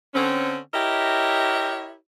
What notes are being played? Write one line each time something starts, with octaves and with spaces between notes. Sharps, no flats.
D3 C4 C#4
E4 G4 A#4 C#5 D#5 E5